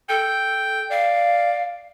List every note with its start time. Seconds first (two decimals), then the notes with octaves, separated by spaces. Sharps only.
0.09 A4 G5
0.91 D5 F5